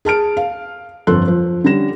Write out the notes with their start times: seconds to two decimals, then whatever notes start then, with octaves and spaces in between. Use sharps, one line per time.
0.05 G#4 A5 F6 D7
0.37 F5
1.07 G1 F2 A4 C6 F#6
1.28 F3
1.64 D3 G3 C#4 A#6 E7